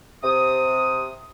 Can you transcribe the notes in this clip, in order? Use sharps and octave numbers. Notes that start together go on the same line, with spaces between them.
C3 D#6